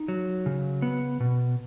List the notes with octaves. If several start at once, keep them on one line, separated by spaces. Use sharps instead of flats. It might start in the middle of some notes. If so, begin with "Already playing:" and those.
Already playing: D#4
F#3
C#3
B3
B2